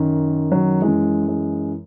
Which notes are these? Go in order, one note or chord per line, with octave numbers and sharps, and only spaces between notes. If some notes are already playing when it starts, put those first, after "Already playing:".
Already playing: F#2 D#3
F#3
F#2 E3 G#3
G#3